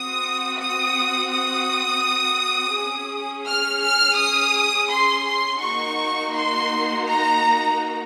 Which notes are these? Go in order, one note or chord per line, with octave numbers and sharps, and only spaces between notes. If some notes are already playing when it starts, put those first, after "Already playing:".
Already playing: C4 F#4 D#6
D#6
D#6
C#4 G#4
F6
F6
D#6
C6
C6
A#3 D#4 F#4 C#6
C6
A#5